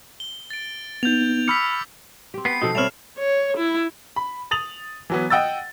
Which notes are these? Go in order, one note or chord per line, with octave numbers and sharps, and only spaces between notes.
G7
A6 D7
B3 D#4 G6 F7
B5 D6 E6 F6 B6 C#7
C4 G4
B3 B4 G5 C7
B2 F3 C4 D#4 A4
G3 C4 C#5 E5 B5 F6 E7 F7
C#5
E4
B5
D#6 A6 F7 F#7
E3 F#3 B3
D#5 F#5 G5 E6 A6